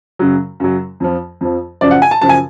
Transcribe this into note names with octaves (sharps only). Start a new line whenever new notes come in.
F#2 C#3 F#3
F#2 C#3 F#3
F2 F3
F2 F3
F#2 C#3 F3 D5
F#5
G#5
A5
F#2 C#3 F3 A5
G#5